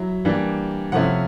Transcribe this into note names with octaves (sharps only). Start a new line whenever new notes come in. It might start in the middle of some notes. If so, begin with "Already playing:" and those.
Already playing: F#3 E4
E3 G3 A#3 D4
C3 F3 A3 C#4 E4 F#5